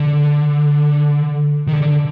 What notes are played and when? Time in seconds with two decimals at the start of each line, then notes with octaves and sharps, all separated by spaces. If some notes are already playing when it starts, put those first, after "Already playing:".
Already playing: D3
1.67 D#3
1.73 D3